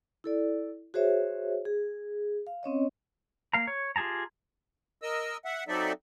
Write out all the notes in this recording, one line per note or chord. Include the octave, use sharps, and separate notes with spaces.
E4 A4 D5
F#4 G#4 C5 C#5 E5
G#4
F5
C4 C#4 C#5 D#5
A#3 F5 A#5
C#5
F4 G4 G#4 A5 A#5
A#4 D#5 E6
E5 F#5
F#3 C4 D#4 A4 D5 E5